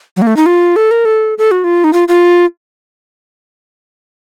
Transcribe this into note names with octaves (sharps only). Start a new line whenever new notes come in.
F#3
A#3
A3
D#4
F4
A4
A#4
A4
A4
F#4
F4
D#4
F4
F4